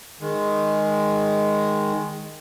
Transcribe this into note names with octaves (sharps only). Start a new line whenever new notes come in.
D#3 G#3